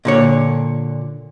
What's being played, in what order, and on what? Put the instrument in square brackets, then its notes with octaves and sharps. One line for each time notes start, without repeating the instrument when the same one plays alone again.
[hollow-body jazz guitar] A#2 D3 C#5